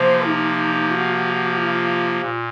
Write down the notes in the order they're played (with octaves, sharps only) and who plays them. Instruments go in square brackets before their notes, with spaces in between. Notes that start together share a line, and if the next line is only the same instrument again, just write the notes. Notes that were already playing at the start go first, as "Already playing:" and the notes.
Already playing: [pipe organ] C3 F3 A#3 [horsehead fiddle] C5
[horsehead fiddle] D#4
F#4
F4
[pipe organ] A#2